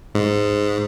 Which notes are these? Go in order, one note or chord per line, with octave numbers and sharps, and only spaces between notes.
G#2